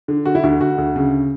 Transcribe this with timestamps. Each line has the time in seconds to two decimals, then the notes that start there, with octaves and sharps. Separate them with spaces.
0.08 D3
0.26 D3 F#4
0.35 E4
0.43 D2 F#4
0.60 D2 F#4
0.78 D2
0.96 C#3